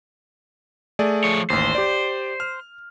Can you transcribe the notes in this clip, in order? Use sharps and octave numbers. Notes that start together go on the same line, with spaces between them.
A3 G#4 D5
F3 C#5
A1 D#2 C5
G4 D5
F6